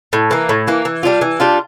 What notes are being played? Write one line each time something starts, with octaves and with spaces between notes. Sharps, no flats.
A2
E3 A#3
A2
E3 A#3
E3
G3 D4 F4
E3
G3 D4 F4